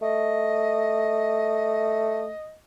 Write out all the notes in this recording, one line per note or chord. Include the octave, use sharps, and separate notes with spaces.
A3 D#5